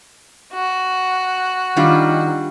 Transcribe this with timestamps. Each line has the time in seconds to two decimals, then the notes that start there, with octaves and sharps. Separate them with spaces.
0.53 F#4
1.76 D#3 G3 D4 F4